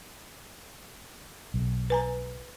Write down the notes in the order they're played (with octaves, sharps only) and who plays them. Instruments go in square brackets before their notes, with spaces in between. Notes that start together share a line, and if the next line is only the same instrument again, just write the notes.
[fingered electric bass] B1
[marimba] B4 G#5 A#5